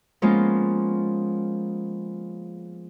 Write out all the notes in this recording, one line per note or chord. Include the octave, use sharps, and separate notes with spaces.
F3 G#3 A#3 B3 C#4 F4